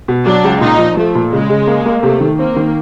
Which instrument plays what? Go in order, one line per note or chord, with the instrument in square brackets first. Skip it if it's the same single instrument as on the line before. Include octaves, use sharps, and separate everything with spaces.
[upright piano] B2
[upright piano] F#3 [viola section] D4
[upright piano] C#2
[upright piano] A#2 [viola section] D#4
[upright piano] F3
[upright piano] F3 [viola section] A3
[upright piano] A#2
[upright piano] C#3 [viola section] G#3
[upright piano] C#3
A#3
A#3
[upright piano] C3 [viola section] A3
[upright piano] D#3
[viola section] A#3 [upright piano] C4
[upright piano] D#3